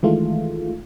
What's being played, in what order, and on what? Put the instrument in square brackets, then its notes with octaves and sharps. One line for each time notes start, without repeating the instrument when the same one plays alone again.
[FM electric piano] D#3 E3 G#3 A3 F4